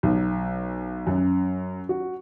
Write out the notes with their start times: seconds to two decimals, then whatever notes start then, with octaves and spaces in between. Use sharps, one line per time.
0.03 B1
1.07 F#2
1.89 F#4